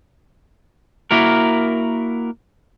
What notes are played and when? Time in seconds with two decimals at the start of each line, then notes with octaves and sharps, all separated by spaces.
1.11 A#3 E4 F#4 A#4